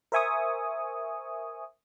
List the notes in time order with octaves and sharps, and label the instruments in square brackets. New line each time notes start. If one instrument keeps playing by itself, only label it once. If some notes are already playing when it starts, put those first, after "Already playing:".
[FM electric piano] A#4 C5 E5 G#5 C#6 D#6